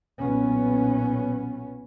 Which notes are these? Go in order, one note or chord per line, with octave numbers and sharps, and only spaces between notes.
B1 A#2 B3 C#4